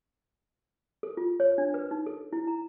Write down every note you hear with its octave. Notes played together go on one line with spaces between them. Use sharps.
A4
F4
C#5
D4
B4
D#4
A4
E4
A#5